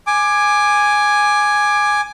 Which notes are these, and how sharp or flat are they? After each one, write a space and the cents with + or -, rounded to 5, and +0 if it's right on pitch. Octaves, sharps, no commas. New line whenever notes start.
G#5 +0 D6 +15